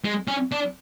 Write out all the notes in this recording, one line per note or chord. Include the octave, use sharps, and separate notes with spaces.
G#3
C#4
D4